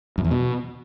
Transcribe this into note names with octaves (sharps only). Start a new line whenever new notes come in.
F#2
E2
B2